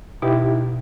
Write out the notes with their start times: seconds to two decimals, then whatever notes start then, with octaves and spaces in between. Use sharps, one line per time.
0.22 B2 D#4 E4 G4